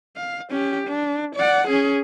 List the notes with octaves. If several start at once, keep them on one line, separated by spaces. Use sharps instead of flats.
F5
C#4 G4
D4
D5 F#5
C#4 G#4